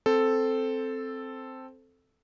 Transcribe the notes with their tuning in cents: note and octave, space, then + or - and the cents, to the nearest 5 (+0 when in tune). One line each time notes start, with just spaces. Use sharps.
C4 +0 A4 +0 C5 +0